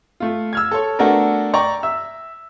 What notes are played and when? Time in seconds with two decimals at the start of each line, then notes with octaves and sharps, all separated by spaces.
0.20 A3 F4
0.53 E6 F6 G#6
0.71 A4 C#5
0.99 A3 B3 D4 F#4 A4 A#4
1.54 D5 G5 A#5 C#6
1.83 E5 E6